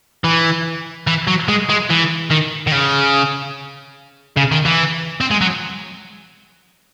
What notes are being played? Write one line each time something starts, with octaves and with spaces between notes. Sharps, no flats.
E3
E3
F#3
G#3
G#3
E3
D#3
D#3
C#3
C#3
D#3
E3
C4
G#3
F#3